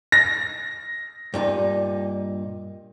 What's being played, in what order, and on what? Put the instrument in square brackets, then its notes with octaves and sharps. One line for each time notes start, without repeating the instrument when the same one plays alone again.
[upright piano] A#6
[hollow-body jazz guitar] G2 A#2 D#4